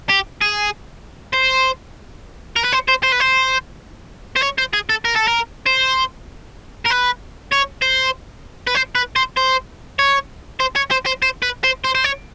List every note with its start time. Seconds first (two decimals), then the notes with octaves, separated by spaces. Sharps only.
0.10 G4
0.41 G#4
1.34 C5
2.56 A#4
2.64 B4
2.72 C5
2.88 C5
3.03 C5
3.12 B4
3.20 C5
4.36 C5
4.42 C#5
4.58 C5
4.73 G#4
4.89 A4
5.05 A#4
5.16 A4
5.27 A#4
5.66 C5
6.85 A#4
6.90 B4
7.52 C#5
7.82 C5
8.67 B4
8.75 C5
8.95 B4
9.16 C5
9.37 C5
9.99 C#5
10.60 C5
10.76 C#5
10.91 C5
11.06 C5
11.23 C5
11.42 B4
11.64 C5
11.84 C5
11.95 C5
12.04 C#5